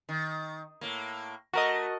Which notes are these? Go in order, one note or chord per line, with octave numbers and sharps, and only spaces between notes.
D#3
A2 A#3
A3 F#4 A#4 D#5